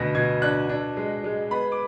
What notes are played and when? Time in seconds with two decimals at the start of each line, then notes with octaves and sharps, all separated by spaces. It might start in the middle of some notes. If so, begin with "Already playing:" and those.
Already playing: D2 B2 A#6
0.15 B2 G#6
0.42 D4 F#6
0.69 D4
0.97 G#3
1.24 G#3
1.51 B3 B5
1.72 D6